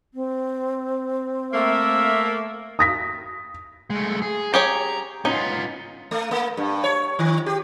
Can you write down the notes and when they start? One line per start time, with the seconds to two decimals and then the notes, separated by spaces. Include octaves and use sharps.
0.14 C4
1.53 A3 A#3 E5
2.79 D#6 A#6 B6
3.90 G#3 A3
4.22 G#4
4.54 G4 G#4 C#5 A#5
5.25 B3 C#4 D#4 F4
6.11 A3
6.31 A#3
6.57 G2
6.84 C#5
7.19 D#3
7.46 G4